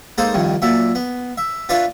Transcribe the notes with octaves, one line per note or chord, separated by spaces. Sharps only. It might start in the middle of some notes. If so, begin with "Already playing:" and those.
G#3 A#3 D#4 A4 C5
C2 F2 D#3
A#2 F#3 E5
B3
E5
D4 F4 B4 C#5 D5 E5